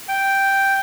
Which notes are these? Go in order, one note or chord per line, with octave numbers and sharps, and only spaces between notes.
G5